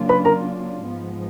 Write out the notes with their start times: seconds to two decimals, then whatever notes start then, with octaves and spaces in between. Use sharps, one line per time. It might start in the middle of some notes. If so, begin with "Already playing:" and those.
Already playing: C#3 F#3 A#3 D4 F4
0.09 B4 B5
0.25 A#4 A#5
0.90 G#2 F3 G#3 B3